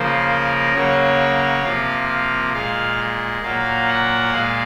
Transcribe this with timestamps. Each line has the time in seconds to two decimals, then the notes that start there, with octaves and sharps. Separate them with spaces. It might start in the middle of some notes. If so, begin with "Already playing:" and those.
Already playing: C#3 F3 A#3 C5
0.28 A#4
0.73 C#3 F#3 A#3 C#5
1.63 C3 F3 A#3 F5
2.09 F5
2.54 A#2 G#3 F5
3.43 A#2 F#3 A#3 F5
3.88 F#5
4.32 A#2 G#3 F5